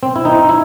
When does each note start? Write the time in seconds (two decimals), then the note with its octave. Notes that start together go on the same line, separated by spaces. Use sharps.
0.03 C4
0.16 E4
0.25 D#4
0.49 E4